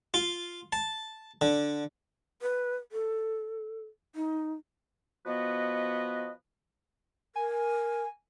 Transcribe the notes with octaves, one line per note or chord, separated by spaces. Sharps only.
F4
A5
D3
B4
A4
D#4
F3 B3 F#4 B4 D#5
A#4 G#5